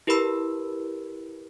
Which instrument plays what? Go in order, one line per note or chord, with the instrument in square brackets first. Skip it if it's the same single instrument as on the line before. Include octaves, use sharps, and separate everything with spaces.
[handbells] E4 G4 A#4 B4 B5 E6